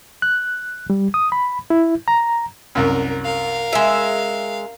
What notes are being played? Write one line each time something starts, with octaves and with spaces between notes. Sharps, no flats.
F#6
G3
D#6
B5
E4
A#5
C2 F#2 A#4
A#4 F5
G#3 E5